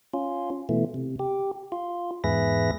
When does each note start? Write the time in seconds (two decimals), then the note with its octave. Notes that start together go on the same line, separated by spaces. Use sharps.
0.14 C#4 F4
0.69 B2 E3 A3
0.94 C3
1.19 G4
1.72 F4
2.24 E2 G#2 G#4 B4 E5 A#6